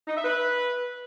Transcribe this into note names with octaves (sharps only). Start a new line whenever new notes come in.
D#4
E5
B4